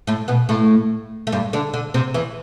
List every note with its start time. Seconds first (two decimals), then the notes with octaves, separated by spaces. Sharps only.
0.07 A2 A3
0.28 B2 B3
0.49 A2 A3
1.27 A3
1.32 G2 G3
1.53 D3 D4
1.73 D3 D4
1.94 C3 C4
2.14 E2 E3